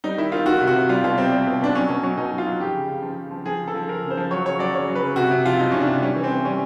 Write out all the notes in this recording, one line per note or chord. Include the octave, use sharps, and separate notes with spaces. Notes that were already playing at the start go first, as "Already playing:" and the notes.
G3 D#4
D#3 E4
D#3 F4
D#3 F#4
C3
F#4
C3
G3 F4
B2 F4
G3 C4
G3
B2
B2 D4
F#3 C#4
B2 C#4
F#3 C#4
B2 D#4
F#3
F4
F#3
F3 G4
C#3
C#3
F3
C#3
F3
F3 G#4
C#3
A4
F3
F3 A#4
C#3
C5
F3
F#3 C#5
C#3 C#5
F#3 D5
C#3 C#5
F#3
B4
C#3
C3 F#4
C3
F3 F4
F3 D#4
C3 C#4
D4
C3
G3 C#4
E3
C4
E3
G3 C#4